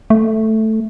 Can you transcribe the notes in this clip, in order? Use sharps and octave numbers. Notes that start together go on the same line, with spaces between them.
A3